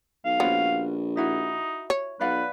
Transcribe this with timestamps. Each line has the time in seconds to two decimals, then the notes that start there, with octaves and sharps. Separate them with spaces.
0.25 B1 F5
0.40 A#1 B3 C#4 F#4 C5
1.17 D#4 E4 F#4
1.90 C#5
2.21 B1 B4 D5 F5 F#5